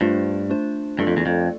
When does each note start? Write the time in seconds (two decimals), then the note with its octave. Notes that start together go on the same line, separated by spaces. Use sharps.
0.01 G2 A3 D4 F4 C5
0.50 A3 D4 F4 C5
0.99 G2 A3 D4 F4 A4 D5
1.07 F2
1.17 E2
1.26 F2